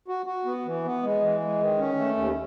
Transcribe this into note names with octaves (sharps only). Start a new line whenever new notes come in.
F#4
F#4
B3
E3
B3
G#3
E3
G#3
D#3
C#4
A3
D#2